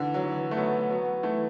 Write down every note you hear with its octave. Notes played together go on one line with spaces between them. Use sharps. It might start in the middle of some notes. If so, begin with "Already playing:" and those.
Already playing: D3 E3
F#3
E3
A3
F#3 B3
F#3 B3
E3 A3